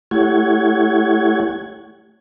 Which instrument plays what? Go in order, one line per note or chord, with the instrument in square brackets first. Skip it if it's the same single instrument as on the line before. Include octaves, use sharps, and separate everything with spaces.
[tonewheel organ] A3 E4 G4 C#5 F#5 G#6